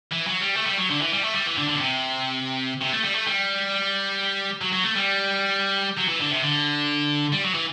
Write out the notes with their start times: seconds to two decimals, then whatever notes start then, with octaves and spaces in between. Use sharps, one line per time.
0.11 E3
0.27 F#3
0.41 G3
0.57 A3
0.67 G3
0.78 F#3
0.90 D3
1.01 E3
1.12 G3
1.23 A3
1.35 G3
1.46 E3
1.57 D3
1.69 D3
1.75 B2
1.80 C3
2.81 C3
2.92 A3
3.04 G3
3.15 A3
3.27 G3
4.61 F#3
4.73 F#3
4.84 A3
4.96 G3
5.97 F#3
6.08 E3
6.20 D3
6.30 C3
6.43 D3
7.32 G3
7.43 F#3
7.54 E3